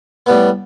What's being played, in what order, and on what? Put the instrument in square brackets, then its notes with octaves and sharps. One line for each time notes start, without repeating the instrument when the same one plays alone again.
[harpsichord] A2 G3 B3